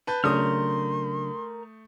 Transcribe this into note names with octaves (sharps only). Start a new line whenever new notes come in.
B4 A5 G6
C#3 F#3 A3 D4 A#4 C6 D#6 F6